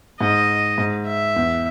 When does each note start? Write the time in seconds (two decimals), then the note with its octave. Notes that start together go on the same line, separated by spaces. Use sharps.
0.20 G#2 D#5
0.78 G#2
1.07 E5
1.36 E2